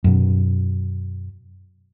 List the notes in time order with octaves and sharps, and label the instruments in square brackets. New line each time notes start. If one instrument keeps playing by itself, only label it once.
[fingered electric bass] F#2 B2